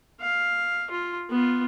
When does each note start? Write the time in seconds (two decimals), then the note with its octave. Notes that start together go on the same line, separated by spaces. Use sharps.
0.21 F5
0.90 F4
1.30 B3 F4